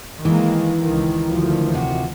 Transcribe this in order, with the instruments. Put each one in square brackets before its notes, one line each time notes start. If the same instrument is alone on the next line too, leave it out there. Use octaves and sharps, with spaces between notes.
[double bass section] D#3 G#3 A#3 [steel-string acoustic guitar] E3
[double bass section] C#2 D#3
D2 D#3 F3
[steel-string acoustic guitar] C3 F#4